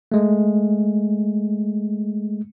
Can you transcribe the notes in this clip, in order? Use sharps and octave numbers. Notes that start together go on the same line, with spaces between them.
G#3 A3